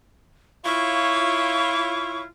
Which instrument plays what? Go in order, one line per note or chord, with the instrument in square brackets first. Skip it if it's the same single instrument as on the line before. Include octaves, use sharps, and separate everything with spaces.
[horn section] E4 F4 C#5 [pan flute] C#6